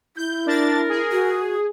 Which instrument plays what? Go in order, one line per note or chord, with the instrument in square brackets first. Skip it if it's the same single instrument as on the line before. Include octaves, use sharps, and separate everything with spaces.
[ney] E4 [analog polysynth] G6
[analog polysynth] D4 A6 [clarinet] A#4
[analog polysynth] G#4
[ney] F#4